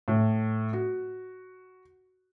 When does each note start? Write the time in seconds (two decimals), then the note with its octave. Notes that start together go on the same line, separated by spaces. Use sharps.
0.08 A2
0.73 F#4